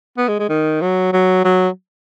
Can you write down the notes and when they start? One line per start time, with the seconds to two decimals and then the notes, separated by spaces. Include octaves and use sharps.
0.18 B3
0.28 G#3
0.39 G#3
0.49 D#3
0.81 F#3
1.13 F#3
1.45 F#3